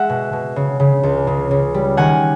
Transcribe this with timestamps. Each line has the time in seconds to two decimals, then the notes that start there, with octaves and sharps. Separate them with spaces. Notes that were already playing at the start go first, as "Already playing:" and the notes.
Already playing: G#3 E5 F#5
0.09 B2
0.33 B2
0.56 C#3
0.80 C#3
1.03 C#2
1.27 C#3
1.51 C#3
1.74 G3
1.97 D#3 F#5 G#5